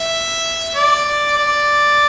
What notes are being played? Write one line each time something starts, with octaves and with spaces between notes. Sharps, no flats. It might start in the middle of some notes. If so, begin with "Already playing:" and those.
Already playing: E5
D5
D5